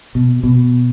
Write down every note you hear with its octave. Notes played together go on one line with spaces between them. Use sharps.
B2
B2